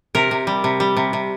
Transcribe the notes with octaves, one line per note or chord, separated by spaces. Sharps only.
C3 A#4
C3
G3
C3
G3
C3
C3